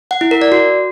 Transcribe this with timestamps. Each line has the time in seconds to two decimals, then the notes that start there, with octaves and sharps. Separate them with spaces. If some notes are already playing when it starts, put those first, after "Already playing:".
0.11 F#5
0.21 E4
0.31 A#4
0.41 D5
0.52 F#4